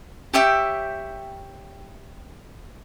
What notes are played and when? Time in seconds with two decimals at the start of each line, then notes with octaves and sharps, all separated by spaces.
0.34 G4 C#5 E5 G5